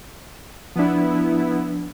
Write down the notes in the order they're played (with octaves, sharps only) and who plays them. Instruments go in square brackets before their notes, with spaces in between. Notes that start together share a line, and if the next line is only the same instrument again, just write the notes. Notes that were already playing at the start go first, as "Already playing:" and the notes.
[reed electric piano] F3 D4 [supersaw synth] B3 E4